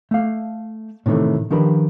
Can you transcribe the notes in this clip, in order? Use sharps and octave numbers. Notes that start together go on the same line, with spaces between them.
A3 F5
A2 C3 D#3 E3 A3
D#3 F3 D4 G4 A#4 B4